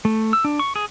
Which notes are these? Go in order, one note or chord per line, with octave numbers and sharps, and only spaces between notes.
A3
E6
D4
C#6
G#4